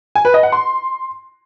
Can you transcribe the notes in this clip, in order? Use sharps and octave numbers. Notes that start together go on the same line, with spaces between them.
G#5
B4
D#5
F#5
C6